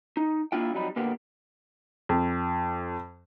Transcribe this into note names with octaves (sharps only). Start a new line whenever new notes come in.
D#4
A#3 D4 E4 F4 G5
F2 F#3 G3 D#4 B5
A#2 D3 A#3 B3 G4
F2